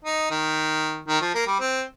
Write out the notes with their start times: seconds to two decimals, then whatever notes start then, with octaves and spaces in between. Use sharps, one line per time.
0.04 D#4
0.31 D#3
1.08 D#3
1.21 F3
1.34 A#3
1.47 G3
1.60 C4